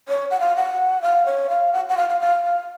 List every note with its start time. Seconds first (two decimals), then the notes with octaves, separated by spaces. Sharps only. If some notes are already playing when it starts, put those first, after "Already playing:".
0.08 C#5
0.31 F#5
0.40 F5
0.56 F#5
1.02 F5
1.26 C#5
1.50 F5
1.73 F#5
1.89 F#5
1.97 F5
2.09 F5
2.20 F5
2.44 F5